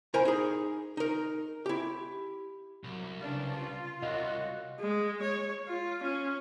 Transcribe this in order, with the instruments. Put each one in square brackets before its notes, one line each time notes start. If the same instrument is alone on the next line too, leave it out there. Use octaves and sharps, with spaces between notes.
[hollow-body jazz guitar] E4 A#4 C5 G#5 A#5
D#4 G#4
D#4 A#4
E4 G4
[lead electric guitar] C2 [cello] F#3
[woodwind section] G2 F5 [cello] C#3 D4
[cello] F4
[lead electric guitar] C2 [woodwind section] F#2 F#4 [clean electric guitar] D#5 F5
[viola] G#3
C#5
F4
C#4